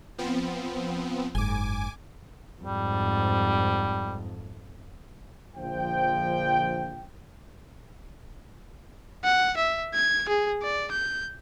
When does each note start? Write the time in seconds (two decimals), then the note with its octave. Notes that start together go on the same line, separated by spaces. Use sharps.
0.18 F3 B3 C4
1.35 F#1 G#2 G#5 D6
2.62 F2 G#2 G3
5.56 A#1 D3 F3 C5 G5
9.24 F#5
9.57 E5
9.94 G#6
10.29 G#4
10.62 D5
10.92 G6